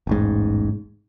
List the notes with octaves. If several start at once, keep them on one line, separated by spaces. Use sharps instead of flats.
E1 A1 G#2